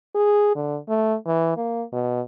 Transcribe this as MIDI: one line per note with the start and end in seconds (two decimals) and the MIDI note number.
0.15 0.54 68
0.56 0.78 50
0.89 1.15 57
1.27 1.52 52
1.57 1.83 58
1.93 2.21 47